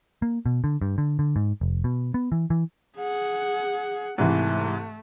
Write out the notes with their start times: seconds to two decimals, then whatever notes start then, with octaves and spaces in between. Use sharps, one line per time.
0.22 A#3
0.46 B2
0.64 D3
0.82 G2
0.98 D3
1.19 D3
1.36 G#2
1.61 F1
1.84 B2
2.14 B3
2.32 E3
2.50 E3
2.98 G#4 F#5
4.18 G#2 C3 E3 A3